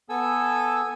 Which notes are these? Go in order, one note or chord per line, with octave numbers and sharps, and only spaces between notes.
B3 A4 G#5 E6